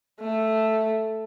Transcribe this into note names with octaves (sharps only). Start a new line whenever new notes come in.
A3